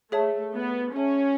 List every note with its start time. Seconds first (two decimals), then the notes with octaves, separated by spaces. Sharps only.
0.11 A3 G#4 C#5 E5 A5
0.53 B3
0.95 C#4 G#4 C#5 E5 A5